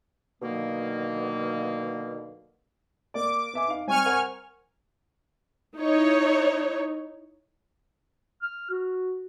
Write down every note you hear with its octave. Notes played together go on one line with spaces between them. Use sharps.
B2 D3 D#3 F#3 A#3
A#3 D5 D6
B3 E5 G#5
D#4 F5
G3 C4 G#5 C#6 F6
A#4 C5 F#5
D#4 E4 C#5
F6
F#4